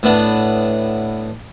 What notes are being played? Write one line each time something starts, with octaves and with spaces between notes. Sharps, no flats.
A2 B3 D4